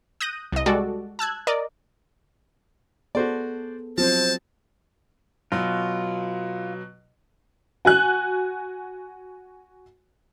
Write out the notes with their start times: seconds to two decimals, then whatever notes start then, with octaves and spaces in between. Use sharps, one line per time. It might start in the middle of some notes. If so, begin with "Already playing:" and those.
0.21 D#6 F#6 G6 A#6 D#7
0.53 C2 D#5
0.66 G3 G#3 F#4 A4 D5
1.19 A5 E6 F#6 G#6
1.47 A#4 D5 D#5
3.15 B3 F#4 G#4 A4 C5 D5
3.98 F3 F#3 C4 F4 C5 A5
5.52 B2 F#3 F4
7.85 F#4 G#5 F#6